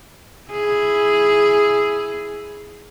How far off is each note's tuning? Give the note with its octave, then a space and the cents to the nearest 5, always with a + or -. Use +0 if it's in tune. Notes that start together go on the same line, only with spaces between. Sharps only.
E4 +0 G#4 +0